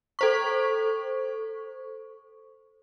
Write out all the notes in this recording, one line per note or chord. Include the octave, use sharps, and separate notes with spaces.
A4 C5 C#6